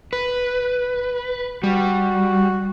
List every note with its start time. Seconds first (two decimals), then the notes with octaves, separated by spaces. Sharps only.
0.13 B4
1.64 G3 F#4